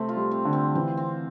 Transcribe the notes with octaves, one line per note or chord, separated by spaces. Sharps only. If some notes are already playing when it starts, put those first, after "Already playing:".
Already playing: C3 A3 C4
F4
G3
C4
D3
C4
E3 C4
C4